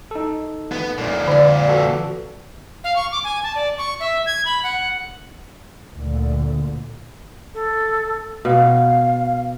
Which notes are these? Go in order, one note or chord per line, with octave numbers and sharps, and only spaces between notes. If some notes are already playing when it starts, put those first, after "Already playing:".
D#4 A4
B3
F2 A#2
D3 D5
F#4 A4 B4
F5
C#6
D6
G#5
A5
D5
C#6
E5
G#6
B5
F#5
D2 A#2 D3
A4
B2 F5